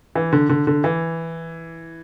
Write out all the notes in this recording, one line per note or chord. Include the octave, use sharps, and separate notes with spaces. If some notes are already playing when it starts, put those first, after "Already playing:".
E3
D3
D3
D3
E3